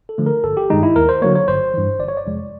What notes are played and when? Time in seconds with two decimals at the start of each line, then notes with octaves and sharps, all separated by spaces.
0.09 A4
0.18 D3 F3 A3
0.26 A#4
0.44 G1 A4
0.57 G4
0.70 G2 D#3 G#3 D#4
0.83 E4
0.96 D#2 A#4
1.09 C5
1.22 D3 F#3 A#3 C#5
1.35 C#5
1.48 G1 C5
1.74 G2 E3
1.99 G1 D5
2.08 C#5
2.17 D5
2.25 F2 C3 F3 G#3